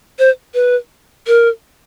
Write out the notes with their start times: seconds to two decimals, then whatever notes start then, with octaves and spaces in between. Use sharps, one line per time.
0.19 C5
0.54 B4
1.27 A#4